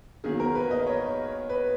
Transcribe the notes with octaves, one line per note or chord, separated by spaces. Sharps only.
E2 D#3 F#3 A#3 G#4
A#4
B4
D#5
C#5
B4